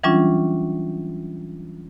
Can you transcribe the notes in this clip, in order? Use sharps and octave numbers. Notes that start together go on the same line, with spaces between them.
E3 F#3 G3 C#4 D4 F4